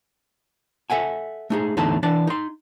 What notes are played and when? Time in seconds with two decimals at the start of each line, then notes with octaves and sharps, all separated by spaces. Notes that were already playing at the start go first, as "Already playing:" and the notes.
0.90 A4 E5 F#5 G#5
1.50 A3 D#4 G#4
1.77 E2 A2 D3 A3 D#4 A5
2.03 E3 D4 D5 A5
2.27 D#4 C6